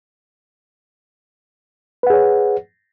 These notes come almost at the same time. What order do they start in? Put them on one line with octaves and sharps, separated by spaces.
B4 F#5 G#4 C#5